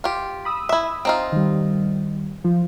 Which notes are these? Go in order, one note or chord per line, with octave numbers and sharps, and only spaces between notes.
F4 G4
B5 D#6 E6
E4 E5
C4 D#4 F4
D#3 G3
F3